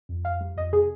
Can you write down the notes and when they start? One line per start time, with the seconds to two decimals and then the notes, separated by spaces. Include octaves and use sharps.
0.09 F2
0.25 F2 F5
0.40 G3
0.56 F2 D#5
0.72 C3 G#4